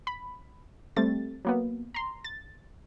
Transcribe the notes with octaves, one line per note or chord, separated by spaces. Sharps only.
B5
G3 A3 C4 A6
F#3 A#3 B3
A#5 C6
A6